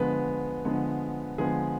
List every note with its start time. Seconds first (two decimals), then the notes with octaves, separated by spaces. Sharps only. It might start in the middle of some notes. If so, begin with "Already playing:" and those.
Already playing: D3 F3 G#3 B3 B4
0.65 D3 F3 G#3 B3
1.38 D3 F3 G#3 B3 G#4